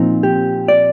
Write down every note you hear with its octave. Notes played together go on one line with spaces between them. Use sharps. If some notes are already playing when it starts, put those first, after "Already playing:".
Already playing: A#2 F3 C4 D#4
G4
D5